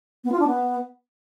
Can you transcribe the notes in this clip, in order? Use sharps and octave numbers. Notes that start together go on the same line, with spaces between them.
B3
F4
D4
B3